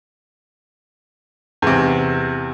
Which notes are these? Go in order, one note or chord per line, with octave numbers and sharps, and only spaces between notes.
E2 C3